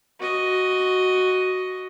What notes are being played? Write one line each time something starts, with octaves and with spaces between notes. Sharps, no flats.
F#4 D#5